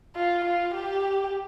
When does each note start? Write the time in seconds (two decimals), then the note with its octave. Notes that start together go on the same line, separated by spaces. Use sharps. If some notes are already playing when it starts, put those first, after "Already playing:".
0.16 F4
0.45 F4
0.75 G4